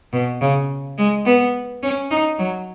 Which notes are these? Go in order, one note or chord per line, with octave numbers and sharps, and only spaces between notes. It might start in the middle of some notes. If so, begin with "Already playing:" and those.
B2
C#3
G#3
B3
C#4
D#4
F#3